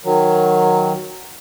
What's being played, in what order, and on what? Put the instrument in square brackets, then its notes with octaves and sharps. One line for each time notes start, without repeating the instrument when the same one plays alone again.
[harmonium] D#3 F#3